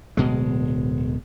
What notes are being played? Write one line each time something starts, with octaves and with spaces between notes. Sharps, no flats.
D1 B2 G#3